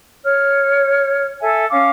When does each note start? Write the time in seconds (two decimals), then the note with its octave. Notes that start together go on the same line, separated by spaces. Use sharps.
0.24 C#5 F6
1.40 A4 E5 G#5
1.69 C#4 F5 D6